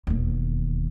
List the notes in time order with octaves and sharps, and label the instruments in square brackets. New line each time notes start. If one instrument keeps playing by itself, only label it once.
[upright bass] E1 D#2